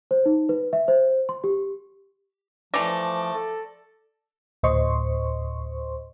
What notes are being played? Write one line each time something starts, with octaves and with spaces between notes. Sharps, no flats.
C5
D#4
B4
E5
C5
C6
G4
E3 F3 A3 D5 D6 A#6
A4
D2 A2 C5 D#5 C6 C#6